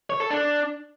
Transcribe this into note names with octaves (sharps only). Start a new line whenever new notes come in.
C#5
A4
D4